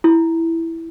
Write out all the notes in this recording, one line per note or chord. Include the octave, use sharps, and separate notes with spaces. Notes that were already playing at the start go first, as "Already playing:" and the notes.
E4